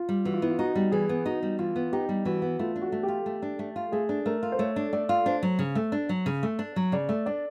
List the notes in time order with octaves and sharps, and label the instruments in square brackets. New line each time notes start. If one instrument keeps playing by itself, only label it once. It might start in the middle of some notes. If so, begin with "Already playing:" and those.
Already playing: [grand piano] F4
[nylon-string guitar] G3
[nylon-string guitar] E3 [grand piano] F#4
[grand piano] F4
[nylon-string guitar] B3 [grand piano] E4
[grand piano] F4
[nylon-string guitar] D#4 [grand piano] F#4
[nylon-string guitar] G3
[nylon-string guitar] E3 [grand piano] G#4
[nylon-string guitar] B3
[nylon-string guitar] D#4 [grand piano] F#4
[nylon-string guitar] G3
[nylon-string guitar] E3 [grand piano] F4
[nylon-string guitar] B3
[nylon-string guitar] D#4 [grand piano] G4
[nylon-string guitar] G3
[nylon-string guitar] E3 [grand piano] F#4
[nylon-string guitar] B3
[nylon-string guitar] A3 [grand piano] F4
[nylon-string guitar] D4
[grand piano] F#4
[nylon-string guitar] A3
[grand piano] G4
[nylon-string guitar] F4
A3
D4
A3
F4
[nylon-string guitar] A3 [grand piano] G#4
[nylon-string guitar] D4
[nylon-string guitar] A3 [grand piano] A#4
[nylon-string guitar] F4
[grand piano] C5
[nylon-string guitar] A3 [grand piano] C#5
[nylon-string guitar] D4
[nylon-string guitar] A3 [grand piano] D5
[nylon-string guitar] F4
[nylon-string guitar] D4 [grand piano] C5
[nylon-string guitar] F#3
C#3
A3
D4
F#3
C#3
A3
D4
F#3
[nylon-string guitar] C#3 [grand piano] D5
[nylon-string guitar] A3
[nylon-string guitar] D4 [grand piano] D5